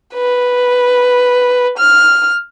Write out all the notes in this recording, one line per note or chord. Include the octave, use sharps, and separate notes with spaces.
B4
F6